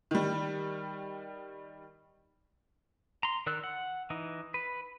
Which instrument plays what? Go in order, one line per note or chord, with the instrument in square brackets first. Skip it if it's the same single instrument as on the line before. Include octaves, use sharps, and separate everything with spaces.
[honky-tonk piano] D#3 G3
[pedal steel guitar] A#5 C6
D#3 A#4 D5 E6 F#6
F#5
E3 D#4
B4